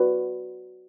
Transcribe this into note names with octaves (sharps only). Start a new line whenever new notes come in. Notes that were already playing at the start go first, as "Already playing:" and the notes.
Already playing: F#4 B4 D5